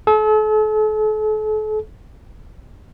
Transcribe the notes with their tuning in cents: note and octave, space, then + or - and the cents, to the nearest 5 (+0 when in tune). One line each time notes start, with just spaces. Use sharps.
A4 -40